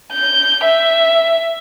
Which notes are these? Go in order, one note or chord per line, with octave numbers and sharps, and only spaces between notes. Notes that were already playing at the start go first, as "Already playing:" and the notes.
G6
E5